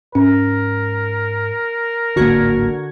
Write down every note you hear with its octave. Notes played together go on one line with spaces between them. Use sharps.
G#2 C#4 A#4
D1 G#1 D3 A#3 F#4 G#6